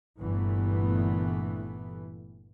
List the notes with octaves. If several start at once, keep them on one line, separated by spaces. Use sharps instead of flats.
G1 G2 A#2 E3 A3 B3